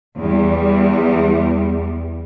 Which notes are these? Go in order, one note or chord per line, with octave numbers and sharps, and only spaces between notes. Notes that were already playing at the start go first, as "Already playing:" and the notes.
E2 G3